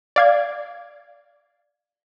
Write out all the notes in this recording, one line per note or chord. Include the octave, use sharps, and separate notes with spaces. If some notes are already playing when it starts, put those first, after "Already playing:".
D5 F5 G#6